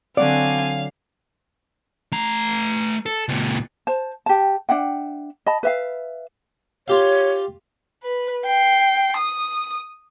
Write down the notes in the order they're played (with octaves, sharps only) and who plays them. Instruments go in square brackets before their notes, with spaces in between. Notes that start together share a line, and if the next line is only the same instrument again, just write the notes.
[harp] D3 F#3 F#5 [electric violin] C4 G#5 [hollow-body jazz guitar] D5 [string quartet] F5
[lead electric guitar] A3 A#5
A4
C#2 A#2
[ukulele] C5 A5
G4 A5
D4 E5 F#5 G5
D#5 A5 B5
B4 E5 F5
[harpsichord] F4 G4 F5 [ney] C#5
[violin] B4
G5 C7
D#6